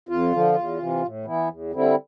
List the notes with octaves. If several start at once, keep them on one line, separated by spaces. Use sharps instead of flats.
F2 F4
D3 F3
E2
C3 E3
A2
E3 B3 E4
E2
D3 G3 C4 E4